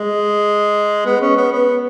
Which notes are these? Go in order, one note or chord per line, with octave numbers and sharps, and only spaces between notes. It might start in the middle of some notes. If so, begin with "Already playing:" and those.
Already playing: G#3
B3
C#4
B3
B3